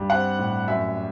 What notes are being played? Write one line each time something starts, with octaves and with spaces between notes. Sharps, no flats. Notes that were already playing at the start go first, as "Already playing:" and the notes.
Already playing: G2
C4 F#5
A2
F#2 E5